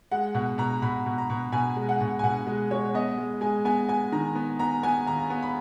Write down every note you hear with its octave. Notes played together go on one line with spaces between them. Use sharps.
G#3 F#5
B2 F#5
B2 A#5
B2 B5
B2
A#5
B2
B2 G#5
G#3
F#5
B2
G#5
B2 F#5
G#3
G#3 C#5
B3 D#5
G#3
G#3 G#5
B3 G#5
B3 G#5
D#3 A#5
B3
B3 A#5
B3 G#5
D#2 A#5
B3
B5